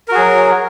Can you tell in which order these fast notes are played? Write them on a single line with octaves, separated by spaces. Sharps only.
A#4 F#4 G#4 F#3